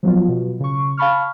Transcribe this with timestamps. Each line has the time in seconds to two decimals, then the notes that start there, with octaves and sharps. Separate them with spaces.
0.03 F3 F#3 B3 F4
0.28 B2
0.60 C#3 C#6
0.97 F5 A5 B5 C#6 F6